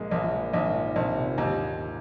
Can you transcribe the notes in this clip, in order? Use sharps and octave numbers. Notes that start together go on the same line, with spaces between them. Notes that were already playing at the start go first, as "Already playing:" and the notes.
Already playing: A#1 G#3 A#3
A#1 A#3
F3
G#3
A#1 D#3
G#2
A#2
A#1 C3
C3
A#2
D#2 G#2
A#2